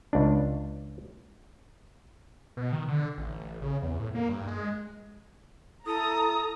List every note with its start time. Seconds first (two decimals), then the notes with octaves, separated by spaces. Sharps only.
0.13 C#2 D4
2.57 B2
2.72 D#3
2.88 D3
3.17 A1
3.62 C#3
3.82 E2
3.99 A2
4.15 A#3
4.29 G2
4.48 G#3
5.86 E4 A4 A#5 D#6